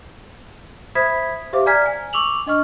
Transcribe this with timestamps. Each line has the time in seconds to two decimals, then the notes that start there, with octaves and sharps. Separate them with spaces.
0.95 C5 E5 B5 D#6 G#6 B6
1.53 G4 C5 E5 F5 D6
1.66 D5 G#5 A#5 F6 G#6 B6
1.86 G#5
2.13 C#6 D6 E6 F7 F#7
2.47 D4 D#5 C#6 F6